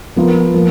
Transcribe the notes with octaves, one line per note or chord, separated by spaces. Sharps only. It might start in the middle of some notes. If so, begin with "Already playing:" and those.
F3 B3 F4 A#4
F3 A#3